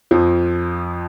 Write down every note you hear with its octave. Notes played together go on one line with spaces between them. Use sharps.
F2 F3